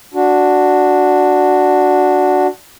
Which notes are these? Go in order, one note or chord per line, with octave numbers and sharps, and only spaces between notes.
D4 F#4